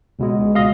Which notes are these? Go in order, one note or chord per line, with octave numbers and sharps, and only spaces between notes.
C#2 B2 G#3
B2 G#3 D#5 F5